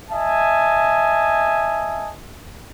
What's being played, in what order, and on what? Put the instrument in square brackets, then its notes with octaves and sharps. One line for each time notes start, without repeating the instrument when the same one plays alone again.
[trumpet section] D#5 E5 G#5 A5